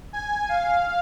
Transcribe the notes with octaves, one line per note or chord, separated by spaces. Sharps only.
G#5
F5